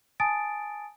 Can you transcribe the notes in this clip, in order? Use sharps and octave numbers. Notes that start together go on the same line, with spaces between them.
G#5 A5 D#6 A6 D7